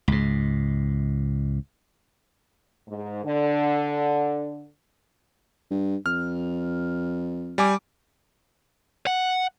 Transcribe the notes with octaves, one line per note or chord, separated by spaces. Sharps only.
C#2 G#2
G#2
D3
G2
F2 F6
G3 G#5 D6
F#5